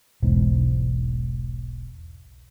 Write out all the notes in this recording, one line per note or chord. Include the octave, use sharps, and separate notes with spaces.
E1 B1 E2 G#2